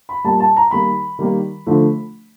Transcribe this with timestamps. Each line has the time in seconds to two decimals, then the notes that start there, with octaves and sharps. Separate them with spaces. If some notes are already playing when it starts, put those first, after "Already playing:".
0.09 B5
0.24 A#2 G3 A#3 A5
0.40 A5
0.57 A#5
0.71 D#3 G3 A#3 B5
1.19 D#3 G3 A#3
1.66 D3 F3 A3